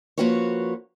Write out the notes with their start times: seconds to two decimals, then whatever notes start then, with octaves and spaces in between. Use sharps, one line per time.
0.18 F3 A#3 C#4 F#4 B4 C#5